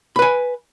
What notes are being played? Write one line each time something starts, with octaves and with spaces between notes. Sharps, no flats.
B4 G#5 B5